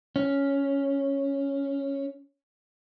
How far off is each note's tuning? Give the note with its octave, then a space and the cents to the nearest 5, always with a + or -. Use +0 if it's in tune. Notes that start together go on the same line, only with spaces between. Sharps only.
C#4 +0